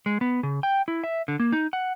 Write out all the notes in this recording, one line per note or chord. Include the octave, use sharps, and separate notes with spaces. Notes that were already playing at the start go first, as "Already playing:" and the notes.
G#3
B3
C#3
G5
E4
E5
D3
A#3
D#4
F#5